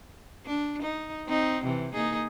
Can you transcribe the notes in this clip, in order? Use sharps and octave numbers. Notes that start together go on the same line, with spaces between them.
D4
D#4
C4 D#4
C3 E3
A#3 D#4 G#4